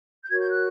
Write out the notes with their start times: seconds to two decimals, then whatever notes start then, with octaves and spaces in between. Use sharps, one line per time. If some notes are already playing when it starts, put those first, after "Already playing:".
0.24 G6
0.30 F#4 A#4 C#5 G#6
0.40 G6
0.50 F#6